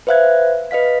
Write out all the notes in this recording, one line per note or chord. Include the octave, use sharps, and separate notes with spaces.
B4 C5 E5 F5 F#6 G#6
B4 D#5 F5 B6